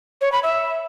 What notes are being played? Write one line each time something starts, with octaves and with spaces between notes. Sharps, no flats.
C#5
B5
E5